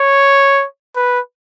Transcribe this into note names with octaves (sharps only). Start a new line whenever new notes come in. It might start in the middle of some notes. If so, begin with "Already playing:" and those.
Already playing: C#5
B4